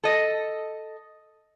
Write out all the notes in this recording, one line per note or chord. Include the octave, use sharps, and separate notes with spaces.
A4 D#5